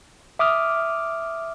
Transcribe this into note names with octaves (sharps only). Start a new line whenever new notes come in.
E5 D6 D#6 F6